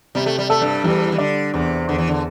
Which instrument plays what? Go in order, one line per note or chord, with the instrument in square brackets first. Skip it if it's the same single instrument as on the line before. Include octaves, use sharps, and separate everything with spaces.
[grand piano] C3 [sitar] G3
[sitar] A3
G3
[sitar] A3 [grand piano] A4
[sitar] G2 G3
[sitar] E2 E3 [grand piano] G3
[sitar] E3
[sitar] D3 [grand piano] D5
[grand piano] E2 [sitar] C3
[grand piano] E2 [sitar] D3
[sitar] E3
D3